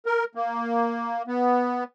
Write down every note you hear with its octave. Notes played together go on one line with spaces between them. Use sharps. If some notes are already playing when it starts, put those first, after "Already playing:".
A#4
A#3
B3